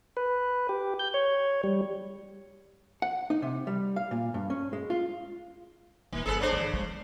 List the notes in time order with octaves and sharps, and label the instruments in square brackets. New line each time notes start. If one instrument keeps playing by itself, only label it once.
[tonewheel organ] B4
G4
G6
C#5
G3
[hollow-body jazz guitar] F#5
D#4
C3
G3
F5
A#2
G2
C#4
G#3
F4
[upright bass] D#1 [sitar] D#3
[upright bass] G1 [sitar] G#4 A4 B4
[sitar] C#3 D4 C5
[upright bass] D#3 F#3
F#3 G#3